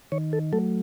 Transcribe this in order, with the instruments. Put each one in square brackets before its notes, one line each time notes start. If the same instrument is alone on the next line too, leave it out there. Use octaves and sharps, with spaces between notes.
[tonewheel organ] D#3 C#5
A4
F#3 A3 A4